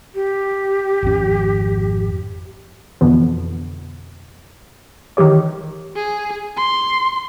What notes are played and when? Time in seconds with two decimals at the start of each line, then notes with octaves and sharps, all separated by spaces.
0.14 G4
1.03 G#1 F2 C#4
3.01 F2 B2 D3 E3 B3
5.17 D#3 E3 G4 C#5
5.96 G#4
6.57 C6